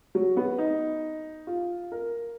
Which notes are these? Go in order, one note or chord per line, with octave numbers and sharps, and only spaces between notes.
F#3
B3
D#4
F4
A#4